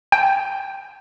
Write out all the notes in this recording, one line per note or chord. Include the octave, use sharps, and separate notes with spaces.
G5